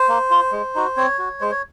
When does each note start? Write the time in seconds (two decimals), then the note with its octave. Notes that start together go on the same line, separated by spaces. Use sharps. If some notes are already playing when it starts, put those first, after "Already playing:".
Already playing: C5
0.08 A#3
0.30 F4
0.52 G#3
0.75 D#4 F#4
0.97 C4 C#5
1.19 F#4
1.41 G#3 C5
1.51 C#5